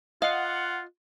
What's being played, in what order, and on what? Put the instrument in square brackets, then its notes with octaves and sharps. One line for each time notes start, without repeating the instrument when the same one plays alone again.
[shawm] F4 [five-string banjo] D#5 F5 [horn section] F#5